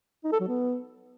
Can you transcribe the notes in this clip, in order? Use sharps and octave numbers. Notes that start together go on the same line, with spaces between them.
D#4
A4
F#3
B3